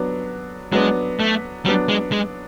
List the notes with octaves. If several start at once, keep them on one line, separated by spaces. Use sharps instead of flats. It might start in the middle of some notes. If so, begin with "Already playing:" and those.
Already playing: F#3 B3 D4
F#3 G#3 B3 D4
A3
F#3 G3 B3 D4
G#3
G#3